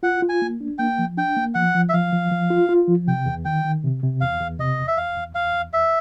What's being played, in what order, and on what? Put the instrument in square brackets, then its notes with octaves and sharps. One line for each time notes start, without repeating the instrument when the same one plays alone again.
[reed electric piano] F4 [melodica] F#5
[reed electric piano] F4
[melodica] G#5
[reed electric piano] A#3
D4
[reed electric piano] A#3 [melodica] G5
[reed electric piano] F3
[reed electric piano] D4 [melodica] G5
[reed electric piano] A#3
[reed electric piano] F3 [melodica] F#5
[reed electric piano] F3
[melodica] E5
[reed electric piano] F3 [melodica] F5
[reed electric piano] F3
F3
F4
F4
F3
[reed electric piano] C3 [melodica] G5
[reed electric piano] E2
[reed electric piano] D#3 [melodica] G5
[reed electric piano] D#3
C3
C3
[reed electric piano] E2 [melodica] F5
[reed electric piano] E2
[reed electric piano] C3 [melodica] D#5
[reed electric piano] E2
[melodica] E5
[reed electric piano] E2 [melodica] F5
[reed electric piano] E2
[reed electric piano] E2 [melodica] F5
[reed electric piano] E2
[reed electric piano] E2 [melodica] E5